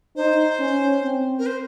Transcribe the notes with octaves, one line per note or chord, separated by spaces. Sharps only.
D#4 C5
C#4
C4
A#4
C5